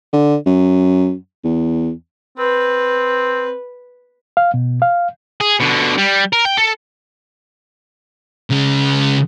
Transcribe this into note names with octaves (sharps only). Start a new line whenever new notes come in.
D3
F#2
E2
C4 B4
F5
B2
F5
G#4
B2 D3
G3
A#4
G5
A4
C#3 G#3